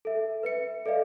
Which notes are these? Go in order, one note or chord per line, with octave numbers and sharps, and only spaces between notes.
A4 E5
B4 E5 C#7
A4 D5 D#5 F5